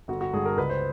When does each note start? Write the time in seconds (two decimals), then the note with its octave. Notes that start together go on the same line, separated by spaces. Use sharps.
0.08 G1 F#4
0.21 F#4
0.33 G2 D3 G#4
0.45 A#4
0.57 C#2 B4
0.70 C5